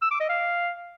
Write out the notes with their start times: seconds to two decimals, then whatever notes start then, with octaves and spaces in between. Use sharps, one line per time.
0.02 E6
0.11 D6
0.20 D#5
0.29 F5